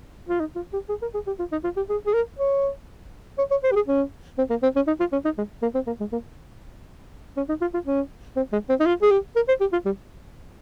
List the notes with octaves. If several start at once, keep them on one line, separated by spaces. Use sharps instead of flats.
F4
D#4
F4
G4
G#4
A#4
G#4
G4
F4
D#4
F4
G4
G#4
G#4
A#4
C#5
C#5
C#5
C5
G4
G#4
C#4
C4
A#3
C4
C#4
D#4
F4
C#4
D#4
G#3
A#3
C4
A#3
G#3
A#3
C#4
D#4
F4
F4
C#4
C4
G#3
C4
D#4
F4
G#4
G4
A#4
C5
G4
F4
G3